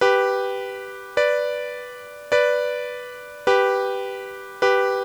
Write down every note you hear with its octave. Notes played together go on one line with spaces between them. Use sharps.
G4 B4
B4 D5
B4 D5
G4 B4
G4 B4